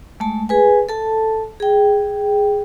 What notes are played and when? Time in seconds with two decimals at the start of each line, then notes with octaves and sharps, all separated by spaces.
0.20 G#3 A3 A5
0.49 G#4 B4 G#5
0.89 A4 A5
1.60 G#4 G5